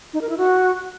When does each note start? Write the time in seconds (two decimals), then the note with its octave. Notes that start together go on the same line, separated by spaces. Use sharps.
0.13 D#4
0.21 A#4
0.29 E4
0.37 F#4